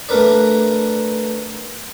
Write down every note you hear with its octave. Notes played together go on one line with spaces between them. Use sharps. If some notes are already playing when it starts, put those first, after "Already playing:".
A3 D4 A#4 B4 D5